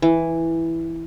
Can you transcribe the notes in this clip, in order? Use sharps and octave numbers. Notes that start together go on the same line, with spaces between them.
E3